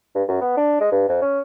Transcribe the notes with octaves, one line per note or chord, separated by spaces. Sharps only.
G2
F#2
B3
D4
G#3
G2
F2
C#4